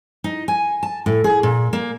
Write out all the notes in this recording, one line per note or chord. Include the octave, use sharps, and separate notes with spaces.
D#4
G#5
A5
A2
G#4
A#2
A#3